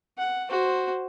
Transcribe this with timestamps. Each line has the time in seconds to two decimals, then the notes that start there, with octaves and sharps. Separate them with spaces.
0.18 F#5
0.50 F#4 C5